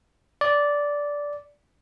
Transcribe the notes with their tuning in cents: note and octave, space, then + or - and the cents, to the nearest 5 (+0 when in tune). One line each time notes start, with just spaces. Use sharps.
D5 -10